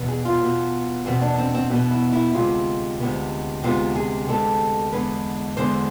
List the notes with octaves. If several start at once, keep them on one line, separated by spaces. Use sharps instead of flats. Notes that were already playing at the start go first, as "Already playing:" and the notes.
Already playing: E2 B2 B3
G#4
F4
E2 B2 B3
E2 B2 B3 C4
D4
C4
C4
E2 B2 B3
E4
E4
D2 C3 G#3 B3 F4
D2 C3 G#3 B3
D2 C3 G#3 B3 F4
G#4
D2 C3 G#3 B3 A4
E2 D3 G#3 B3 B4
E2 D3 G#3 B3 C5